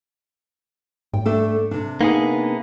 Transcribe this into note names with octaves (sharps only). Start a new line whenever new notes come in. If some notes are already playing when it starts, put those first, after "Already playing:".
G#2 G5
A3 D4 A4
C3 D4
A#3 B3 D#4 G#4